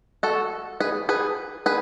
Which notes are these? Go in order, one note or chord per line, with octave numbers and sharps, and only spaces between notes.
F#4 A4
G#4 B4
G#4 B4
G#4 B4